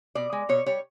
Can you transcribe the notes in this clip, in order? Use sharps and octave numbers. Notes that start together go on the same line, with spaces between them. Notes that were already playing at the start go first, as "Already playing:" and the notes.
B2 D5
G#3
B2 C#5
G3 C#5